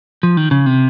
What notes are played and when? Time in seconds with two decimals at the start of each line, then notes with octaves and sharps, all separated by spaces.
0.23 F3
0.37 D#3
0.51 C#3
0.66 C3